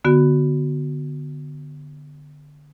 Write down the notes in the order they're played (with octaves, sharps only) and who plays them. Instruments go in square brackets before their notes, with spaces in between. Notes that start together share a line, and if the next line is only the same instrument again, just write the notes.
[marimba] D3 B3 F#4